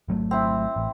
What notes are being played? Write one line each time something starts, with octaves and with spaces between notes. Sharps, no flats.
G#1 F#3 A3
C4 E4
A1